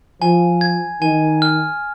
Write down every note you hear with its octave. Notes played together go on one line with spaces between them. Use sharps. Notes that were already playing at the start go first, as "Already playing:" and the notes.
F3 G#5
G#6
D#3 G#5
F6